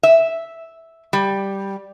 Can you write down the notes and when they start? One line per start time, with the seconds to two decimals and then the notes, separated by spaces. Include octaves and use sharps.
0.03 E5
1.13 G3